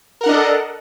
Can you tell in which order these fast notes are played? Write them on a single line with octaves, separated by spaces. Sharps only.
A#4 F#5 D4 D#5 A4